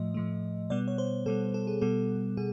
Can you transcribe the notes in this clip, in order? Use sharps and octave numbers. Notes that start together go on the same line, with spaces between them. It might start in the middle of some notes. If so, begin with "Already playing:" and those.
Already playing: A2 F3 A3 D#5
A2 F3 A3
B2 G3 B3 D5
C#5
C5
B2 G3 B3 A4
A4
G#4
B2 G3 B3 A4
B2 G#4